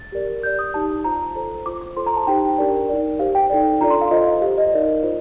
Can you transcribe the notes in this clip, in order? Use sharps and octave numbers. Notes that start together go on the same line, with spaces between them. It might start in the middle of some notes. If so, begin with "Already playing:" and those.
Already playing: A6
G4 A#4 D5
G4 D5 G6
D#6
D#4 G4 D5 A5
F4 C5 A#5
F4 A4 C5
F4 C5 D6
D6
F4 A4 C5 C6
A#5
A5
D#4 G4 C5 G5
D4 G4 A#4 D5
D#4 A#4 D5
G4 C5 F5
G5
D#4 A4 D5
D4 F4 A4 D5 A#5
C6
F5
F4 A4 C5 D#5
F5
G4 C5 F5
D#5
D#4 A#4 D5
F4 C5